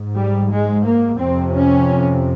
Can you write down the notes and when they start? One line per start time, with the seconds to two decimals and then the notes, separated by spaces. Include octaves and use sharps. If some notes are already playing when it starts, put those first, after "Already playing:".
Already playing: G#2
0.16 G3
0.51 G#3
0.85 A#3
1.20 F2 C3 C4
1.54 C#4